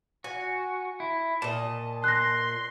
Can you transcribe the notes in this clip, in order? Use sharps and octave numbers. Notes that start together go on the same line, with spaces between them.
F#4 G#5
E4
A#2 D#5 A5
C6 F#6 A#6